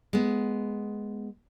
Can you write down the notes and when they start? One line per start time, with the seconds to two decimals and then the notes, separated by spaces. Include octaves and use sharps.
0.13 G#3 B3